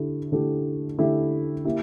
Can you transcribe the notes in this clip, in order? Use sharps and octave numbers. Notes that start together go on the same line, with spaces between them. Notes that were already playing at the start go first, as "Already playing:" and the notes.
Already playing: D3 A3 E4 G4
D3 A3 E4 G4
D3 A3 E4 G4
A#3 E4 G4